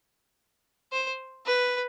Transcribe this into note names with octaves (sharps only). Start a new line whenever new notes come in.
C5
B4